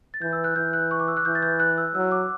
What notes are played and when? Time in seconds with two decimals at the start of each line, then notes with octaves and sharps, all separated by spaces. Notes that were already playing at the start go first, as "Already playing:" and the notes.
0.14 A6
0.21 E3 G6
0.33 E6
0.44 F#6
0.56 E3 G6
0.73 F#6
0.91 C#6
1.00 D6
1.08 E6
1.17 F#6
1.25 E3 G6
1.35 A6
1.42 G6
1.60 F#6
1.78 E6
1.95 F#3 E6
2.11 D6